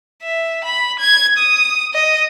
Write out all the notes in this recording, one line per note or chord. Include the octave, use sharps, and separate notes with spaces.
E5
B5
G#6
D#6
D#5